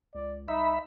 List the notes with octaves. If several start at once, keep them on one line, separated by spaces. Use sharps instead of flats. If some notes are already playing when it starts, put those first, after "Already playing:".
C#2 D5
C2 D#4 E5 B5